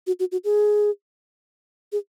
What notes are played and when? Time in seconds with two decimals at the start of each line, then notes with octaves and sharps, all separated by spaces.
0.07 F#4
0.20 F#4
0.32 F#4
0.45 G#4
1.92 G#4